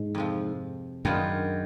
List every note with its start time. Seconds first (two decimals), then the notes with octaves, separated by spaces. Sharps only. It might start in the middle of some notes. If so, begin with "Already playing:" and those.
Already playing: G#2 G#3
0.15 F2 C3 F3
1.05 F#2 D#3 G#3 B3 D4 F4